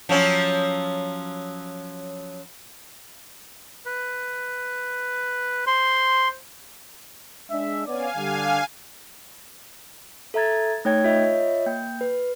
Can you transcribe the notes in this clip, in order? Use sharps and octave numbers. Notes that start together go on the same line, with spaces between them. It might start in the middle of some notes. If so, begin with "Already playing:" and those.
F3 F#3 C#4
B4
C5 C6
G#3 D4 E5
B3 C#4 D5 F5 G#5
D3 G3 D4
A4 E5 A#5 G#6 A6
A3 D#4 C#5 G5 G#6
F4 C#5 D#5 E5
A#3 G5 G6
B4